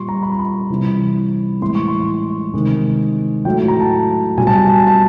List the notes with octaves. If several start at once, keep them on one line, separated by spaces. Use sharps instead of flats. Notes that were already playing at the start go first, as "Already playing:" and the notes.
Already playing: A#2 G3 C6 C#6
A#5
B5
A#5
B5
C3 E3 G3
A2 E3 G#3 C6
C#6
C6
C3 D#3 G#3
A2 F#3 A3 G5
A#5
A5
B2 G3 G#5
A5
G#5
A5
G#5
A5